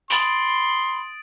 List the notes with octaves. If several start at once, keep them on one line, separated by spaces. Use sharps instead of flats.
B5 C6 D#6 A6 D7